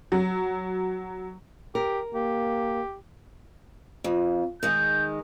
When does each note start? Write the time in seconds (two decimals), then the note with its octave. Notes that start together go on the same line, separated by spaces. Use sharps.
0.12 F#3
1.75 G4 A#4
2.15 A#3 G4
4.04 F2
4.63 D#3 G#3 G6